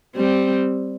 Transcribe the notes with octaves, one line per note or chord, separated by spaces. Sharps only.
G3 C4